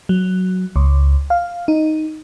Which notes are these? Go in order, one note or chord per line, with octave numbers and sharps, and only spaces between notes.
F#3
C#2
F5
D#4